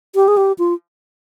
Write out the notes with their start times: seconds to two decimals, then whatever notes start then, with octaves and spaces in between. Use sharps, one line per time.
0.15 G4
0.28 G#4
0.37 G4
0.59 F4